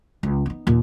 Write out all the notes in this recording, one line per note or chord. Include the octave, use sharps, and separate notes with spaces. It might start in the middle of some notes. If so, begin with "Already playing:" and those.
C#2
B3 D#4
D#2 A#2